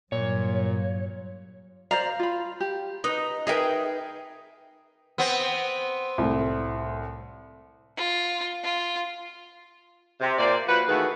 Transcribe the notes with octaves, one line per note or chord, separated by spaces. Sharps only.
G2 A#2 F#3 C#5
C5 D5 F5 A#5
F4 B5
G4
D#4 B4
D#4 G#4 A#4 B4 E5 G5
B3 C4
C2 A2
F4
F4
C3
A#2 A#3 C5 D5
F3 F4 F#4 B4
D#3 E3 A3 F#4 G#4 B4